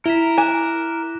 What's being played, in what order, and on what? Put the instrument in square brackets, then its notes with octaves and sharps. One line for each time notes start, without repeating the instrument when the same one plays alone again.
[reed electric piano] E4 [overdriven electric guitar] A#4 [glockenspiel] B6 E7 G7
[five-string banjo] G#5 [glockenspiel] D6 F#6 E7